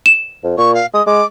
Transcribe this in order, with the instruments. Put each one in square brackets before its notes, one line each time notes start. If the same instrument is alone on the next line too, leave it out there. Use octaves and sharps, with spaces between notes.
[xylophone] E7
[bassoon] F2
[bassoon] A#2 [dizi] C#6
[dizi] F5
[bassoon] G#3 [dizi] D#6
[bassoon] G#3 [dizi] D6